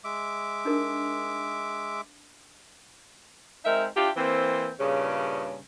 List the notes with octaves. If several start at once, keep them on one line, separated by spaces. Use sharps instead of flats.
G#3 E5 D6
D4 D#4 A#4
G#3 C4 D#4 A#4 E5
D4 E4 F4 G4
E3 A#3 C4
G2 A#2 C#3